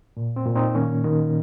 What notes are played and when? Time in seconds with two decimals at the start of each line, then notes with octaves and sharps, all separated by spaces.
0.17 A#2
0.36 C4
0.46 A#2
0.56 C4 D#4
0.75 D#3 A#3 C#4
1.04 D#3